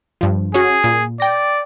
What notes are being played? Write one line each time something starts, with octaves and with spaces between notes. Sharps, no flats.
G2 F3
C#4 F#4 G#4
A#2
D5 G5 A#6